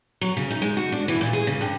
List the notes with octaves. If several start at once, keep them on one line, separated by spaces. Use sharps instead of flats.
F#3
C#3
D#4
G#3
F#4
D4
E3
A#2
G#4
C#3
G2